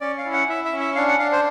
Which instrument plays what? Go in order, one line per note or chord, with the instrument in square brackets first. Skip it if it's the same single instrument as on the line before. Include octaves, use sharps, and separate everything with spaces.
[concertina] C#4 D5
F5
E4
F#5
E4 E5
E5
C#4
E5
D4 F5
F#5
D4 F5
C5